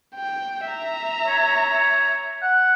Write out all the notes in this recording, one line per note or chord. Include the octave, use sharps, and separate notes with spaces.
G5
E5 A#5
C#5
F#5